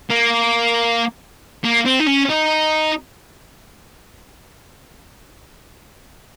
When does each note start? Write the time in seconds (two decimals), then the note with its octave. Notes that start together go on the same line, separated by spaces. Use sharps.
0.10 A#3
1.65 A#3
1.86 C4
2.00 D#4
2.07 C#4
2.30 D#4